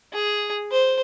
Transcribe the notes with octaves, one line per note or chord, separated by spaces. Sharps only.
G#4
C5